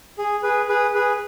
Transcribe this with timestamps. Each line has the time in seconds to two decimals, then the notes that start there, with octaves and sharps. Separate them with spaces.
0.18 G#4
0.43 G#4 B4
0.69 G#4 B4
0.94 G#4 B4